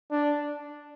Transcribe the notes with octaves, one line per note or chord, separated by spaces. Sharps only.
D4